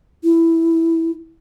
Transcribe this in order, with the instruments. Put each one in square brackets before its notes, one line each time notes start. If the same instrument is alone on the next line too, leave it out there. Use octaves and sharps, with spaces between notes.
[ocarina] E4